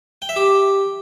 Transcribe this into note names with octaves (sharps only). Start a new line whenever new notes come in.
G5
E5
G4